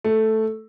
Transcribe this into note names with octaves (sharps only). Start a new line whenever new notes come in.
A3